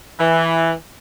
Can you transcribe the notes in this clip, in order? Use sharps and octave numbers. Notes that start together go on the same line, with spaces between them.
E3